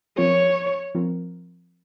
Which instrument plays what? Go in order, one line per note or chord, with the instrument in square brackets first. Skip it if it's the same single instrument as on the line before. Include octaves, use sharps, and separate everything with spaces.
[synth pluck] F3 C4 F4 A#4 [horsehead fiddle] C#5
[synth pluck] F3 C4 F4 A#4